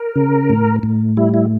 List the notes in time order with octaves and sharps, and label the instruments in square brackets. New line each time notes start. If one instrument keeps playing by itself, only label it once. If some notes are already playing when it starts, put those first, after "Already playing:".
Already playing: [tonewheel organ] A#4
C#3
A2
A2
G3 E4
E4